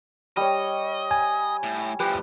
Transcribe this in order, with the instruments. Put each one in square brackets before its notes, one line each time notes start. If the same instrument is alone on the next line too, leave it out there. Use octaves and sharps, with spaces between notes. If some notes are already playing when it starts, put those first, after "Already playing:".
[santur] G3 C#5 [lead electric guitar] D#5
[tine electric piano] G#5
[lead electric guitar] A2
[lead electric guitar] A2 F3 [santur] G4 B4